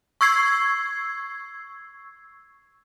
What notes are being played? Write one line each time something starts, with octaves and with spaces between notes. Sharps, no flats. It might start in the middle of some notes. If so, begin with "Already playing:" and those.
C#6 E6 G#6 C7